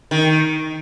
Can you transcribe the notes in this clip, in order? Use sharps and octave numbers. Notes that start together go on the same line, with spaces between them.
D#3